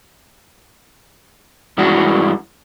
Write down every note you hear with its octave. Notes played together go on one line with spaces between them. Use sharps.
G2 E3 G#3 D4 F#4